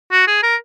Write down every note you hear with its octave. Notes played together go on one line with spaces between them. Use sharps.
F#4
G#4
A#4